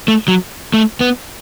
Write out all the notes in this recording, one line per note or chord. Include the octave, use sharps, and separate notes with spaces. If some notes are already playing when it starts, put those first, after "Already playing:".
A3
F#3
A3
B3